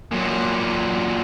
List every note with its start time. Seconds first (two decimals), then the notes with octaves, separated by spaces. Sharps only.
0.11 A#2 F#3